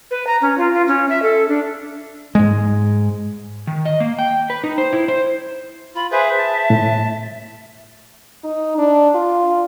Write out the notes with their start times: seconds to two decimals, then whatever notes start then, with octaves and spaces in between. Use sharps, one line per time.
0.11 B4
0.27 A#5
0.42 C#4
0.58 F4
0.74 F4
0.88 C#4
1.09 E5
1.22 A4
1.48 D4
2.35 G#2 G#3
3.67 D#3
3.85 D#5
4.00 A#3
4.19 G5
4.50 B4
4.64 D#4
4.78 C5
4.93 E4
5.08 C5
5.95 F4 B5
6.12 G#4 B4 C5 E5
6.38 A5
6.70 A2
8.44 D#4
8.78 D4
9.15 F4